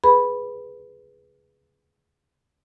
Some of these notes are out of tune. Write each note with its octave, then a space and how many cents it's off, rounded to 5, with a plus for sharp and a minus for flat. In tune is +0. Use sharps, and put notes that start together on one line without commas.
G#4 +0 B4 +0 B5 -5